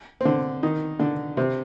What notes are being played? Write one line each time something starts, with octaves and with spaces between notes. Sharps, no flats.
C4
D3 D4
D#3 D#4
D3 D4
C3 C4